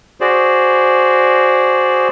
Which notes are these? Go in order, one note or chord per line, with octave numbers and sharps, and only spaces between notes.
F#4 G#4 C5 D5